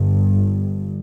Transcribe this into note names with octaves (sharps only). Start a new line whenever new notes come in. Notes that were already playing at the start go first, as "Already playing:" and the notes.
Already playing: G1 G2